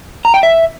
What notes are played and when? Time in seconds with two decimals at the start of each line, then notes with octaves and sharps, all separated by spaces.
0.25 A#5
0.34 G5
0.43 E5